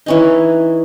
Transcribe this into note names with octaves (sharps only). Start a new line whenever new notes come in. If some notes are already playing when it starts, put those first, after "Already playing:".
E3 C#4 D#4